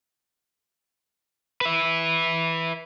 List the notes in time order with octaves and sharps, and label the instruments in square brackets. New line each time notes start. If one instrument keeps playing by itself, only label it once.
[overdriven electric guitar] B4 E5